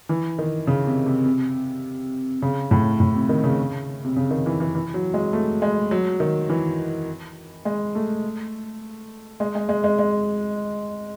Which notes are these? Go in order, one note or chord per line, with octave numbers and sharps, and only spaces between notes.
E3
D#3
C#3
C3
C3
C3
C#3
A2
A2
C3
D#3
C#3
C3
C#3
D#3
E3
E3
E3
F#3
G#3
A3
G#3
F#3
D#3
E3
G#3
A3
G#3
G#3
G#3
G#3
G#3